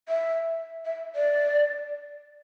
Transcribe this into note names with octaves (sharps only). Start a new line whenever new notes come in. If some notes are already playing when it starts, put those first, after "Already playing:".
E5
E5
D5